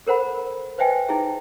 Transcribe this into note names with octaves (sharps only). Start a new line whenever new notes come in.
A4 A#4 C5 F#5 B5
B4 C5 D#5 E5 G5 G#5
D#4 E4 G#4 E5